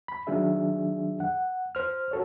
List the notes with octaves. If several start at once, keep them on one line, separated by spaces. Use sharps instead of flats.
B5
D#3 F#3 D4 G#4 E5
F#5
C5 F6
F#4 A4 C#5